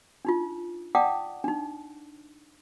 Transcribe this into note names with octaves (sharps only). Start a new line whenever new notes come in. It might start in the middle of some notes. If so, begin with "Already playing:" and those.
D4 D#4 F4
D5 F#5 G5 A5 D6 D#6
D4 D#4